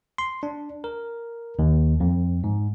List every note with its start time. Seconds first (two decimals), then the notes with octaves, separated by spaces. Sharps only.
0.18 C6
0.43 D4
0.84 A#4
1.59 D#2
2.00 F2
2.44 G#2